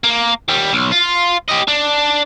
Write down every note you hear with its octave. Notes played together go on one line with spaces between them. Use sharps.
A#3
D#2 G3
B1
F4
G4 D#5
D4